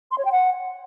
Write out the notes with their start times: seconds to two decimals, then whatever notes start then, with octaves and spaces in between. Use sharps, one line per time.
0.11 C6
0.18 C#5
0.25 G5
0.32 F#5